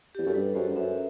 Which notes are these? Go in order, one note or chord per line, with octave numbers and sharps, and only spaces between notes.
E2 G4
F#2 A4
G2 B4
F#2 C5
G2
F#2 E5